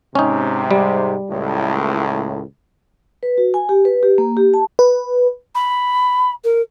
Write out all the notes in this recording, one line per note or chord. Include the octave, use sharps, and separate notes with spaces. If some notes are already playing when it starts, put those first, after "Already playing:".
G#2 C3 C#4 D#4
G3
C#2 A2
B4
F#4
G#5
G4
B4
G4
A#3
G4
A5
B4
B5
A#4